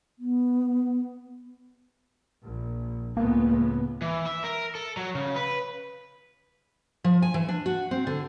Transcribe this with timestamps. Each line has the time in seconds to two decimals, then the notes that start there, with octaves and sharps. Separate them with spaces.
0.19 B3
2.44 A#1
3.17 C#2 A2 A#3 B3
4.02 E3
4.26 E5
4.44 A#4
4.75 A4
4.97 F#3
5.15 C#3
5.36 B4
7.04 F3
7.22 G#5
7.34 E3
7.49 D4
7.66 F#4
7.91 C4
8.07 D3